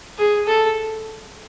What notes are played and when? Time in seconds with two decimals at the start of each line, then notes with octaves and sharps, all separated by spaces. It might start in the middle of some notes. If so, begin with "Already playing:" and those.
0.18 G#4
0.47 A4